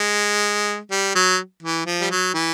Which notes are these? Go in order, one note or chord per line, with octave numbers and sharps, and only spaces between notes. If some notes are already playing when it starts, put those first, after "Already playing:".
Already playing: G#3
G3
F#3
E3
F3
G3
F#3
E3